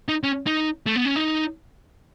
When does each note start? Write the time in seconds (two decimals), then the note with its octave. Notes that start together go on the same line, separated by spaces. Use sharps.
0.08 D#4
0.23 C#4
0.46 D#4
0.86 A3
0.96 B3
1.05 C#4
1.16 D#4